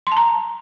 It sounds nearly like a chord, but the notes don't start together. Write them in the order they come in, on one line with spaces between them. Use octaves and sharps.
C6 A5 A#5